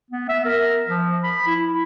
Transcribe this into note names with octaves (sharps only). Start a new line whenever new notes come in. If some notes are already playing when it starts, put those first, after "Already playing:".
B3
E5
A#4
F3
B5
E4